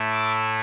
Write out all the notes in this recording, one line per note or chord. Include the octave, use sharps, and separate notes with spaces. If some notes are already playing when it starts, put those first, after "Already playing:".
Already playing: A2 A3 E4
A5 D6